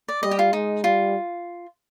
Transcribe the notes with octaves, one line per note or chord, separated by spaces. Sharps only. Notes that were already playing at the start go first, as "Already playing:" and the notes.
D5
G3 D#5
G4
F4
G#3 D#4
G3 F4